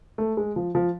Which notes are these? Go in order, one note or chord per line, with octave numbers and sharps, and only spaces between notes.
A3
G#3
F3
F3